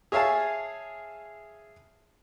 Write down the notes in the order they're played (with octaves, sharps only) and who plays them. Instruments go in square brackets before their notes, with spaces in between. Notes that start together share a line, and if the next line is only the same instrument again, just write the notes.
[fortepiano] G#4 C#5 E5 F5 G#5 A5